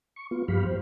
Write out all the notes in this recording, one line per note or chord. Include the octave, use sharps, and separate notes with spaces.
C#6
B3 F4
G2 F3 G4 F5 B5
C5